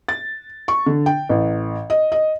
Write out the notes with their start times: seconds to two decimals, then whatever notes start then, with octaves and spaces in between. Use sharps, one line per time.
0.08 A6
0.68 C#6
0.86 D3
1.06 G5
1.29 A1
1.90 D#5
2.12 D#5